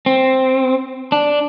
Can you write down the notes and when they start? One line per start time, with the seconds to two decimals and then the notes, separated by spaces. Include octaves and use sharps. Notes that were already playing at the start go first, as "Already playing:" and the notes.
0.06 C4
1.12 D4